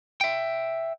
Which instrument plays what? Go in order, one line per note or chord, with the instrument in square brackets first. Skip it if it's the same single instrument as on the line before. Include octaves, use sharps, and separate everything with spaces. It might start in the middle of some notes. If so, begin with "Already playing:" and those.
[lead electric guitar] E5 G5